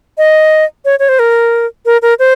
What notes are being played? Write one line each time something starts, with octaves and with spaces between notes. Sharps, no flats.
D#5
C#5
C#5
C5
A#4
A#4
A#4
C5